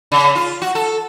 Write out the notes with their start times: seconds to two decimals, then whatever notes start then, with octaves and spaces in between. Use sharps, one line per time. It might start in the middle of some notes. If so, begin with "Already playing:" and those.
0.12 C#3
0.35 F4
0.62 F#4
0.75 A4